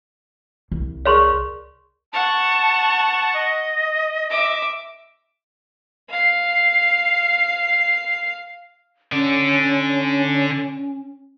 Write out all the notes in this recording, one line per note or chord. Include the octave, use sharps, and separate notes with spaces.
C2
G#4 A#4 C#5 D5 C6 C#6
F#5 A5 C#6
D#5
E5 D6
F5 C7
D3 C#4 D5